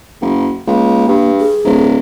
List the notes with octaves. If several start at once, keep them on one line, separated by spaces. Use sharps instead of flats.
F#1
C#2 A#3
G2
G#4
D1